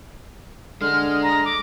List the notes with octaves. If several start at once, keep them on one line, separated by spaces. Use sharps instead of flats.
D3 G#3 F6
A#5
D6